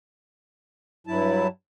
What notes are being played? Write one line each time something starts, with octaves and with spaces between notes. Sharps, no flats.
G2 F#3 E4 A5